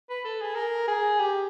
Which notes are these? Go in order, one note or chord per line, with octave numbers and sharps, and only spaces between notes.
B4
A4
G#4
A#4
G#4
G4